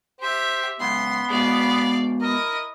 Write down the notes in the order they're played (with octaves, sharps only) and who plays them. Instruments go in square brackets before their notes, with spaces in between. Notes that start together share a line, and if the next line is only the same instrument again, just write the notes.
[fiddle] G4 E5 [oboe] C5
[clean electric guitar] C#2 F#2 [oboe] B3 [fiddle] C6
[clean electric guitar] G#2 B2 G#3 [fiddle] D5 F5
[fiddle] E4 D#5 [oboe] A#4